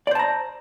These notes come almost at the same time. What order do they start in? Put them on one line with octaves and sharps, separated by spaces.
D5 C5 A5 A#5